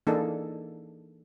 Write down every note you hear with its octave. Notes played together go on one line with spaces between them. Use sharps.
E3 A#3 D4 D#4 G#4 A4